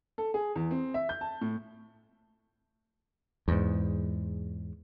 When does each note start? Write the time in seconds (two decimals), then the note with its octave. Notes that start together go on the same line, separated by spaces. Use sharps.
0.18 A4
0.34 G#4
0.56 E2
0.71 C4
0.94 E5
1.09 G6
1.21 A5
1.41 A2
3.48 E2 G#2